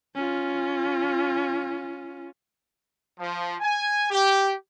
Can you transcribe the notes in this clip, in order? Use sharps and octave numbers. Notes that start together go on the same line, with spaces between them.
C#4 F4
F3
G#5
G4